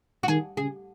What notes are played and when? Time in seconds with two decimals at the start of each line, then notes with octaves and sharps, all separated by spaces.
0.23 F#4
0.28 D#3 G#4
0.57 C#3 G#4